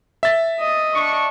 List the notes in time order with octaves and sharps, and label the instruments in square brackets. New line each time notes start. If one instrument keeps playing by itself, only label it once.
[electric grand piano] E5 A6
[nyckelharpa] D#5
[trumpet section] D4 C#6